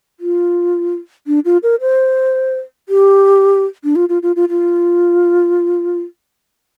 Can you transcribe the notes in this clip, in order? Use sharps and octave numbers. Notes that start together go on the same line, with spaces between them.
F4
D4
F4
A#4
C5
G4
D4
F4
F4
F4
F4
F4